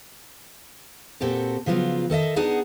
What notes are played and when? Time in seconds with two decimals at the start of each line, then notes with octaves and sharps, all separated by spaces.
1.20 A#2 C4 F#4 G4 A4
1.66 C#3 F3 F#3 B3 F4
2.10 D#3 A4 D#5 E5
2.36 B3 D4 D#4 G#4 F#5